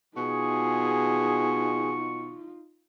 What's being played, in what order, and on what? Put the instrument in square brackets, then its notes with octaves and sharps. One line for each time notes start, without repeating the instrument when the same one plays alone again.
[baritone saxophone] B2 [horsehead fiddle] D#4 F4 [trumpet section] G#4 [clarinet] C#6